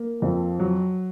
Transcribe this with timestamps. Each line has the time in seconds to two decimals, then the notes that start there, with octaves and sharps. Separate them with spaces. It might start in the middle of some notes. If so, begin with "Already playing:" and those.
Already playing: A#3
0.22 F2 F3
0.59 F#3